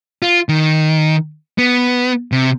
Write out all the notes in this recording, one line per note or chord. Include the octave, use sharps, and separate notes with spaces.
F4
D#3
B3
C3